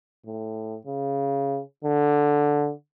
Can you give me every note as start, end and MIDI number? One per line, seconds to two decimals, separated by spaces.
0.26 0.76 45
0.87 1.60 49
1.84 2.71 50